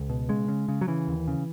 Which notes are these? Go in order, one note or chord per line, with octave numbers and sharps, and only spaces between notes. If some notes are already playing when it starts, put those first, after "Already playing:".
Already playing: C#2
B2
C#3 G#3
C#3
C#3
F#3
C#3 E3
D#2
C#3